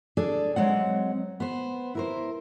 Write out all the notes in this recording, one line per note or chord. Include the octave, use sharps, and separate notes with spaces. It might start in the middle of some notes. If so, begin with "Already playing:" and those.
D4 G#4 A4 D5
F#3 G#3 C4 F#5
B3 C5
E4 A#4 C5